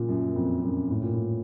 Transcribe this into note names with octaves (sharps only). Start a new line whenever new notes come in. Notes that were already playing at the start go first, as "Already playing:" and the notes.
Already playing: A#2 C#3 F3
F#2
F2
F#2
A2
A#2
A2